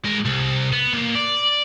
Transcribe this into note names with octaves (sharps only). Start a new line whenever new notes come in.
G#2 A#4
C2
B3
A#2
D5